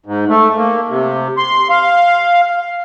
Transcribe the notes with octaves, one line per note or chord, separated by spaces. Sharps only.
G#2
A3
A#3
C3
C6
F5